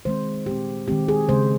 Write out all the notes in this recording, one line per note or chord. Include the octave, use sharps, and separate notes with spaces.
D#3 G#3 C4 C5
A#2 G#3 C4 G4
D#3 G#3 C4 G4
G#4
C#3 G#3 C4 C5